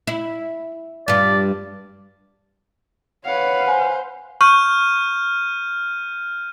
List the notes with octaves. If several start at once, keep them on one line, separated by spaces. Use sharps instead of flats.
E4
G2 F4 D5
B4 C#5 F5 F#5
C5 G#5
C#6 F6 G6 D#7